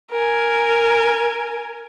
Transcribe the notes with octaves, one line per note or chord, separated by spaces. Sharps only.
A#4 G#5